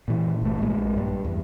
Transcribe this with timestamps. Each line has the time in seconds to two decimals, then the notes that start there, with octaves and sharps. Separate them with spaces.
0.08 A#2 E3
0.42 G1 A3
0.62 A#1 G#3 A#3
0.96 G2 G3
1.24 E2